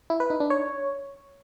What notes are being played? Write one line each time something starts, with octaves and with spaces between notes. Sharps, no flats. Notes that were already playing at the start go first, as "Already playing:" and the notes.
E4
B4
D#4
D4
C#5